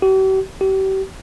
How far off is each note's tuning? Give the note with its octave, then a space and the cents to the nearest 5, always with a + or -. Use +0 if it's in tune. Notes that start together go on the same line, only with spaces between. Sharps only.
G4 -45
G4 -35